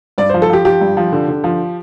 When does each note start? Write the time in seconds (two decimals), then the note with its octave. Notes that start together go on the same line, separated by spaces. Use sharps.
0.18 G2 D5
0.29 F3 C5
0.42 A4
0.50 F3 G4
0.65 F3 G4
0.81 G2
0.97 F3
1.12 D3
1.28 D3
1.44 F3